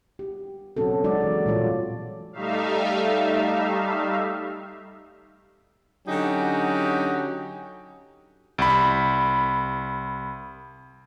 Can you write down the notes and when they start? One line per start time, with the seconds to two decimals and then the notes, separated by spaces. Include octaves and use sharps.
0.19 G4
0.77 B2 F#3 C4 C#4 F#4 A4
1.04 F#3 G#3 D#4 F#4 D5
1.21 E3 A#3
1.46 A#2 E3 G3 F4 C#5
2.33 G3 A3 D#4 E5 F5
6.07 D3 F#3 C#4 D#4 F#4 G4
8.58 C2 B5